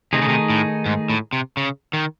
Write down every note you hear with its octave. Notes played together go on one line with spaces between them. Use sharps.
C3 D#3 A3 D#4 G#4 D#5
C#3
C3
A2
G#2
A2
C3
C#3
D#3